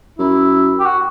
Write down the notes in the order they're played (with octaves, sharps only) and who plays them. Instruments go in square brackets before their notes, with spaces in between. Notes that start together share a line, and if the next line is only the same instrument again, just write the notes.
[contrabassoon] F#2 [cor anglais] E4
[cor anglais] G4
F#4